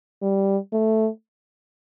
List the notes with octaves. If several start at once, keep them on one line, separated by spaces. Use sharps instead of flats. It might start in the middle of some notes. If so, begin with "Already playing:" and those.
G3
A3